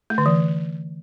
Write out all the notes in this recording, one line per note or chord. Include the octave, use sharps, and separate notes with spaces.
A3
D3
E3